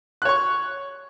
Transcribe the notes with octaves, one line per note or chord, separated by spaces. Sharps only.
C#5 C#6 F#6